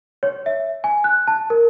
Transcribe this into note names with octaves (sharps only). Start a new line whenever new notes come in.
C#5
E5
G#5
F#6
A5
A#4